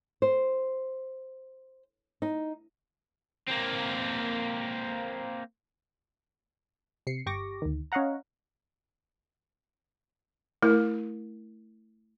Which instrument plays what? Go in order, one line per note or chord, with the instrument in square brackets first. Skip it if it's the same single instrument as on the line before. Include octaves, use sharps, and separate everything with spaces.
[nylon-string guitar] C5
D#4
[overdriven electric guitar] A#3 C4
[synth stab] C3 C7 C#7
G1 G4 C#6 D6 A#6
D2 D#3
C#4 C#5 D#5 F5 F#5 A#5
[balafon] A3 E4 A#4